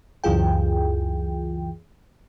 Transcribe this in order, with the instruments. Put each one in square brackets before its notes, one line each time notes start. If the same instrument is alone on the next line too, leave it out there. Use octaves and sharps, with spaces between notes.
[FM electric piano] C#2 F#2 E3 F4 G#4 G5